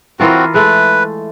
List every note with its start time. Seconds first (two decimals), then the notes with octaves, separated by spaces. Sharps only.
0.20 E3 C4 F4 F#4 A#4
0.54 G#3 A3 B4